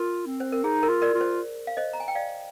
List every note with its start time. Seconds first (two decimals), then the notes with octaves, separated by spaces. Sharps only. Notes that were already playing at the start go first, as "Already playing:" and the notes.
Already playing: F4 A#4
0.26 C4
0.40 C5
0.52 A#4
0.64 D#4 G#4
0.83 A#4
0.89 F4
1.02 A#4 D5
1.14 F4
1.21 C5
1.67 F5
1.77 C5 D#5
1.93 A#5
2.00 G#5
2.08 G5
2.15 D5 F5